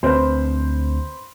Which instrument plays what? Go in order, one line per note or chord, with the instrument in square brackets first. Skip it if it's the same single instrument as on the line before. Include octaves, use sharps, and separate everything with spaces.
[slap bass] D2 C4 [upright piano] B4 C5